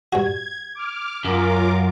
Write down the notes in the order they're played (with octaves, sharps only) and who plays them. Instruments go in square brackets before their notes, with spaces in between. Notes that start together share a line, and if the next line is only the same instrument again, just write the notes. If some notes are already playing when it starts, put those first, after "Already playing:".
[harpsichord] G2 F#4 [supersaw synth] G#6
[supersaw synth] D6 F6
[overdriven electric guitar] F#2 [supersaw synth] F4 A#4 D6